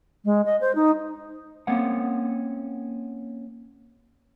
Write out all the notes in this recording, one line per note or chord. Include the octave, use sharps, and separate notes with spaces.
G#3
D#5
C5
D#4
A#3 C4 C#4 F5 F#5